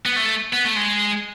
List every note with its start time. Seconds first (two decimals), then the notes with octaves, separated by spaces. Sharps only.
0.06 B3
0.16 A3
0.53 B3
0.65 A3
0.76 G#3